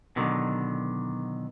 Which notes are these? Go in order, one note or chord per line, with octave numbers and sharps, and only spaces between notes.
B2 D3 D#3 F#3